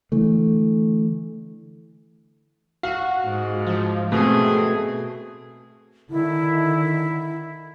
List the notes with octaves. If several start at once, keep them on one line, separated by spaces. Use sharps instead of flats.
D3 E3 A3
F#4 F5
G#2
F3
B2 A3 C4 G#4
D3 D#3 E4